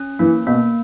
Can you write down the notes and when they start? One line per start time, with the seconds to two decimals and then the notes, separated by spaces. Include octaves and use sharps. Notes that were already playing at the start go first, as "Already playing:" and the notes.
Already playing: C#4
0.19 E3 A#3
0.47 B2 A#3